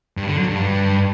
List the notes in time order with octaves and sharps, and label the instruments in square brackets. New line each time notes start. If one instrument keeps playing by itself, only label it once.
[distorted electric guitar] G2
D3
F#3
G2